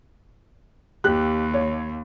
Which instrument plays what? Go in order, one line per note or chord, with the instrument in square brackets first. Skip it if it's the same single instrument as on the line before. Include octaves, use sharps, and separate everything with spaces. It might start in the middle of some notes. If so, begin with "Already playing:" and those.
[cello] D#2 [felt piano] G4 F#6
[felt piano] C#5